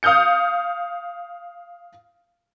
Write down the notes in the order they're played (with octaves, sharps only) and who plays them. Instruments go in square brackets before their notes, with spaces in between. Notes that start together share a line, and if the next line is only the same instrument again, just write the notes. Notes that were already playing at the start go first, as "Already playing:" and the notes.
[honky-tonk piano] F5 D#6 F6 G6 C#7